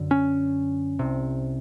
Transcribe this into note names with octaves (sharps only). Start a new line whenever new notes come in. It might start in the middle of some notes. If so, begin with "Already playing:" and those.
Already playing: F#2 D3
C#4
C2 C3